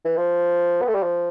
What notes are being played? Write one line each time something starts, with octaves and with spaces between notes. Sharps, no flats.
E3
F3
B3
A3
G3
F3